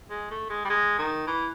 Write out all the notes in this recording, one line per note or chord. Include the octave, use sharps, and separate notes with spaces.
G#3
A3
G#3
G3
G#3
D#3
E3